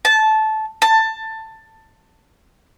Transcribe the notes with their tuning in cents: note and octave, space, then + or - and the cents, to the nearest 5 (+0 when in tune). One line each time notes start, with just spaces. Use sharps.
A5 -15
A5 +15